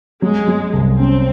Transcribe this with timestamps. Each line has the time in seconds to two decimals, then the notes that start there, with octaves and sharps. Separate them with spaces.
0.22 F#3 G#3
0.48 F#3
0.73 C2
0.99 C4 C#4